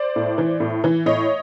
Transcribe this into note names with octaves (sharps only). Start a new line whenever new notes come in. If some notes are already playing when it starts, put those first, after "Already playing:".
Already playing: C5 D5
A2
E3
A2
E3
A2 C#5 D#5